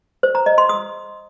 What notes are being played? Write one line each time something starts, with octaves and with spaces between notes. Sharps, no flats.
C5
A#5
D#5
C6
D#6